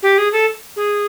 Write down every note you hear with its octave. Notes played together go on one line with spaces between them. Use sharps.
G4
G#4
A4
G#4